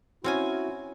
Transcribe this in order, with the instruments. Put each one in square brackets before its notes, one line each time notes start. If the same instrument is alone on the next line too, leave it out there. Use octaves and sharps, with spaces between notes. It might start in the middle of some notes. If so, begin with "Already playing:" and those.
[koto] C4 C#4 G#5 [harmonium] E4 F#4